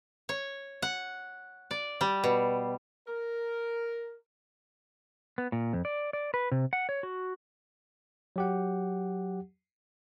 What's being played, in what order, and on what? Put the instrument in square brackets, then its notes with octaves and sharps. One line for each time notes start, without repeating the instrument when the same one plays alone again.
[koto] C#5
F#5
D5
G3
B2
[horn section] A#4
[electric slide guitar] B3
A#2
F2
D5
D5
B4
C3
F#5
C#5
F#4
[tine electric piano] F#3 G4 F#5